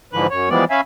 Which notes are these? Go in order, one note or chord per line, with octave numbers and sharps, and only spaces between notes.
G#2 D3 E3 F3 B4 F#6
F#2 C#5
E3 F3 G3 G#3 B3 D5
C#4 E5 F5 G#5 B5